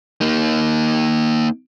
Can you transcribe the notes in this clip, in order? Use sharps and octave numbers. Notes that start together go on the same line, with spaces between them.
A#3 D#4